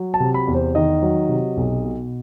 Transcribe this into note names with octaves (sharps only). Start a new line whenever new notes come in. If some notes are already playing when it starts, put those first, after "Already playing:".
Already playing: F#3
A5
C3
B5
E2
C5
D#3 D#5
F#3
C3
B1
B2